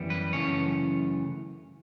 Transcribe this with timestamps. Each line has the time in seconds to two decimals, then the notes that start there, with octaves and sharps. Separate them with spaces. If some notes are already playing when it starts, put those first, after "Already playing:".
Already playing: F#2 E3 G3 B3
0.10 B4
0.33 F#2 C#3 E3 A3 C#5